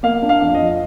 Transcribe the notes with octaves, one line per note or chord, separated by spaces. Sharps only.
A#3 F5
D4
F5
F2
D#5
F3